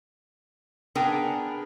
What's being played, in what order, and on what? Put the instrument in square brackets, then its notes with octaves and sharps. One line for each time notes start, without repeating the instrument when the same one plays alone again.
[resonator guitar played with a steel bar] B3 D4 G#4 A#4 G5 G#5